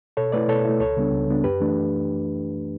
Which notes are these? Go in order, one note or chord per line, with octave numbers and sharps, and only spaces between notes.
B2 A4 C#5
A3 E4 B4 D5
B2 A4 C#5
A3 E4
C#2 A4 C#5
C#3 G3 B3 D4
C#2
C#3 G3 B3 D4
F#2 G4 B4
E3 A3 D4